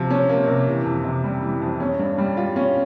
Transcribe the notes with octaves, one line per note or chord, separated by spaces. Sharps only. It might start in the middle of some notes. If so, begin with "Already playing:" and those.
Already playing: C3 F3
C#4
A#3
C3
E3
F2
C3
G3
E3
F2
C#4
G2
G3
F4
C#4